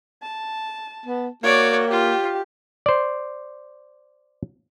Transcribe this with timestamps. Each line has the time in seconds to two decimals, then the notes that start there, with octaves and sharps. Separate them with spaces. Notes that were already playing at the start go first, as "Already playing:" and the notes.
0.22 A5
1.06 B3
1.43 A#3 F#4 C#5 D5
1.91 F4 G4
2.86 C5 D5